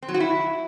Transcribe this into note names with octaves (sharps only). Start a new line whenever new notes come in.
C4
F#3
F#4
E4